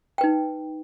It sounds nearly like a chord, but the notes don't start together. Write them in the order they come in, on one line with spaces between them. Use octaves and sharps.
G5 B4 D#4